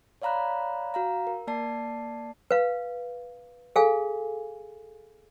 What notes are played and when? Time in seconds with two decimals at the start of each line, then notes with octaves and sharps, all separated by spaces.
0.22 C#5 D5 F5 A#5 B5 F#6
0.94 F#4 F5 A#5
1.27 A#4
1.47 A#3 D5 A5 C7
2.51 B4 F5
3.76 G#4 A4 F5 G#5